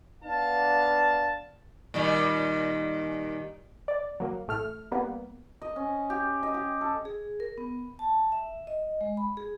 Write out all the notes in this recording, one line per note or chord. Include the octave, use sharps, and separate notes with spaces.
B3 D4 F5 A5
A#2 D#3 G3
D5
F#3 A#3
A1 A3 F6
G3 A#3 B3
D#5
C#4
G4
D#5
G4
A4
G#4
A#4
B3
A5
E5
D#5
G#3
B5
G#4